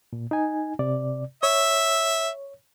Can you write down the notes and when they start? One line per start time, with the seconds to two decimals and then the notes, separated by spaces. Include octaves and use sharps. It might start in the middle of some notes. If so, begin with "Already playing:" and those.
0.13 A#2
0.31 D#4 G#5
0.79 C3 D5
1.43 C#5 E5